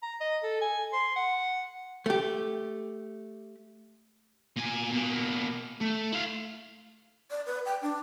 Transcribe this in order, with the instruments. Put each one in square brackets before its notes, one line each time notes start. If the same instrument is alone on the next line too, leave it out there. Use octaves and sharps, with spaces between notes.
[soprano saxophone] A#5
D#5
A4
G#5
C6
F#5
[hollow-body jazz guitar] A3 G4
[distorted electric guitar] A#2 G#5
B2 A#3
A3
E4 F5
[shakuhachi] D5
B4
G5
D4